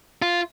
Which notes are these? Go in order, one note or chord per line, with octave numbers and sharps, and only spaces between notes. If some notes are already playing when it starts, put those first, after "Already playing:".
F4